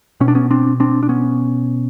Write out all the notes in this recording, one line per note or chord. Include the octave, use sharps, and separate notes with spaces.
B2 C#4
D4
B3 C#4
C4 D4
C4 D4
D4
B3 C#4